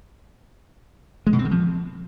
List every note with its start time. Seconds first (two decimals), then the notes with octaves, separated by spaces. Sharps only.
1.27 G#3
1.33 B2
1.39 C4
1.45 D#3
1.51 F3